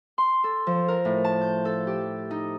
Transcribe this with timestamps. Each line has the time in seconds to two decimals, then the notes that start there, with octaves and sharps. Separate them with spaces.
0.18 C6
0.44 A4
0.67 F3
0.88 A#4
1.05 A2
1.24 A5
1.41 G6
1.65 A4
1.87 G4
2.31 D#4